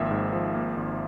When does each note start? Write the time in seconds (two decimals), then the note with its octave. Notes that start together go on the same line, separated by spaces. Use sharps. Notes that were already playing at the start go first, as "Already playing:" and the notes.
Already playing: G#1 F3 A#3 E5
0.11 G#2
0.33 F3
0.54 A#3
0.77 G#1